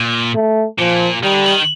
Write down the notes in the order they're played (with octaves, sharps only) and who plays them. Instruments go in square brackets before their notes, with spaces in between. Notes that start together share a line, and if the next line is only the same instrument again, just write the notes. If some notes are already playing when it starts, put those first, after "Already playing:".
Already playing: [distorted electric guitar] A#2
[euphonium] A3
[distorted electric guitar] A#2 [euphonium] F3
[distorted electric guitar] D#3 [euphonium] G3
[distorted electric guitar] D3
D#3